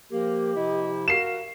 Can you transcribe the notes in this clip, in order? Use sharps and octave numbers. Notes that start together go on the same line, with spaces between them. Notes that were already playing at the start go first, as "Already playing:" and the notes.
F3 A#3 G4 A#4
C3 F3 E4 D#5
F#4 A#4 F5 C7 E7